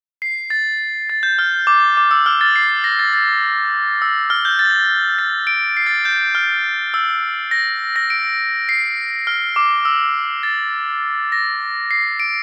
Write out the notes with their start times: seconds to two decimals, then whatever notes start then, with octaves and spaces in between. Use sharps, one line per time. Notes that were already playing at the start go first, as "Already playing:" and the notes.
0.22 C7
0.50 A6
1.10 A6
1.23 G6
1.39 F6
1.67 D6
1.97 D6
2.11 E6
2.26 F6
2.41 A6
2.56 C7
2.84 A#6
2.99 A6
3.14 A6
4.02 E6
4.30 F6
4.45 G6
4.59 A6
5.19 A6
5.47 D7
5.77 C7
5.87 A6
6.05 G6
6.35 F6
6.94 E6
7.51 A#6
7.96 A#6
8.10 D7
8.69 C7
9.27 F6
9.56 D6
9.85 E6
10.43 A6
11.32 A#6
11.91 C7
12.20 D7